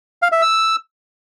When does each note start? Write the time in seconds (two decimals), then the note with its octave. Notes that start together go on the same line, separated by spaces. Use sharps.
0.22 F5
0.32 E5
0.42 E6